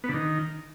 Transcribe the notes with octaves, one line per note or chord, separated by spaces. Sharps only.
B3
D3
D#3